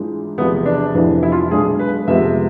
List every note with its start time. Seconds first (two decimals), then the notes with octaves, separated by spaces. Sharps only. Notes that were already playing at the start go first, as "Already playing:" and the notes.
Already playing: G#2 E3 G#3 D4 F4
0.37 E1 E2 C3 F3 B3
0.66 D4
0.94 F2 C3 E3 B3 D4
1.23 E4
1.32 F4
1.51 B1 B2 G#3 D4 G#4
1.79 B4
2.07 F2 C3 G#3 B3 F4 E5